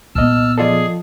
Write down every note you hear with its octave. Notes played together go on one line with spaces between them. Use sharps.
C2 A#2 B3 D#5 A5 E6 F6
F3 F4 G#4 A4 D5 D#5